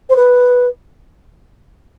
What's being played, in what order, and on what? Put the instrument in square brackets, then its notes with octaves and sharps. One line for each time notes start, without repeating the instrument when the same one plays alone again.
[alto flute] C5
B4